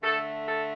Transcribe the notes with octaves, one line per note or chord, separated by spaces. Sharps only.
D3 A3 A4
A4